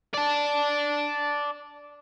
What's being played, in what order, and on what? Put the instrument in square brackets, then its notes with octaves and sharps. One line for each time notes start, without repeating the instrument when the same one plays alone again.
[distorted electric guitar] D5 A5